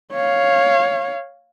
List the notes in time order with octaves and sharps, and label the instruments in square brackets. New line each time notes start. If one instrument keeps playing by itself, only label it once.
[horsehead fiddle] C#5 F5